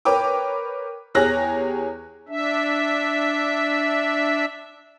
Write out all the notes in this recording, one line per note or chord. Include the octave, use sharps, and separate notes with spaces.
A#4 B4 C#5 G5 D6
E2 G4 G#4 C#5 F#6 A#6
D4 E5